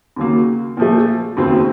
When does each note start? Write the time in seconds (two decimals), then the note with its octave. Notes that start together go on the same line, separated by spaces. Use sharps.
0.16 D#2 C#3 F#3 A#3
0.77 A#2 F3 A3
1.37 F1 D#2 C#3 F#3 C4